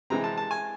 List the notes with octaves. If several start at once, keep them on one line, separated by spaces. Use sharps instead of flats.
C3 E3 G#3 C4 A#5
A5
A5
G#5